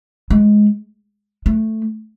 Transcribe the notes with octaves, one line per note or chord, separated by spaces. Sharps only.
G#3
A3